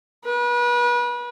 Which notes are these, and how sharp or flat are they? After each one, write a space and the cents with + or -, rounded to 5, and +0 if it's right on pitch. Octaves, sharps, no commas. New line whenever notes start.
B4 -35